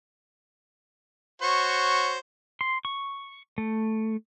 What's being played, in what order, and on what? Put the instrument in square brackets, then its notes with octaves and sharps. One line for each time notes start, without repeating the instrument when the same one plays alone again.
[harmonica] F#4 C5 C#5
[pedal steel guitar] C6
C#6
A3